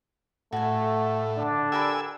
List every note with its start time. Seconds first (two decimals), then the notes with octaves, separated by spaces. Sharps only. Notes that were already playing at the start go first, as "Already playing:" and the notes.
0.53 A2 A3 F#4 G#5
1.37 D3 D4
1.72 G4 A#4 G#5 B5 E6